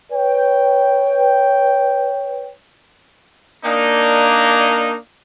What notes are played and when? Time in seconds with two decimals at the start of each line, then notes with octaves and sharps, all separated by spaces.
0.12 B4 C#5 G5
3.65 A#3 D4 D#4